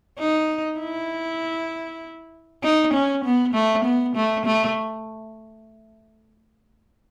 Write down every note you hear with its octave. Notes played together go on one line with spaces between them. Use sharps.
D#4
E4
D#4
C#4
B3
A3
B3
A3
A3